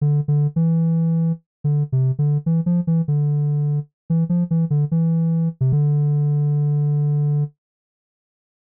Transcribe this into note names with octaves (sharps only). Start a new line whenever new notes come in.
D3
D3
E3
D3
C3
D3
E3
F3
E3
D3
E3
F3
E3
D3
E3
C3
D3